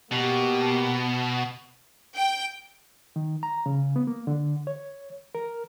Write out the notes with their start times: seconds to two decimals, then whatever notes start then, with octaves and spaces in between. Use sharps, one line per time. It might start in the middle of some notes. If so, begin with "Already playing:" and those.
0.11 B2 A#3 G4
2.16 G5
3.16 D#3
3.43 A#5
3.66 C#3
3.96 B3
4.07 A#3
4.27 D3
4.67 C#5
5.35 A#4